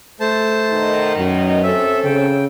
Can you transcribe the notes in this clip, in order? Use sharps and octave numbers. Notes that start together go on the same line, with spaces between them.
A3 C5 A5
B2 D#3 D#4
F#2
C4 C#4 A4 E5
C#3 G5